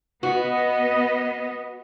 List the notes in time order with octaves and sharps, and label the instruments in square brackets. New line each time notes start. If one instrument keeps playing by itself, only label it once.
[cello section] B3 D#5 [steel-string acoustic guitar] F#4